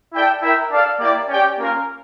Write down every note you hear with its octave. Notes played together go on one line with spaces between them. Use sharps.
E4 A4 D5 G5
E4 A#4 E5 G5
D4 A4 D5 F5
A#3 E4 G4 D5
C#4 G4 D5 G5
A#3 C#4 F4 A#4